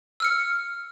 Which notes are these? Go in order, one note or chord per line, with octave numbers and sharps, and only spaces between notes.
E6 F6 C#7